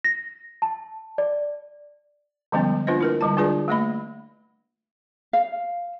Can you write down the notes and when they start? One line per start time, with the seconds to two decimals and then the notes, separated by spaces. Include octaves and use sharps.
0.04 A#6
0.62 A5
1.18 D5
2.52 D3 F3 G3 G#3 B3 C#4
2.87 A#3 D4 F4 B4 C5 D#5
3.01 E4 A#4 B4
3.21 D3 G3 G#3 A5
3.37 D4 F4 G#4 B4 D5
3.68 A3 A#3 D#5 B5
5.33 F5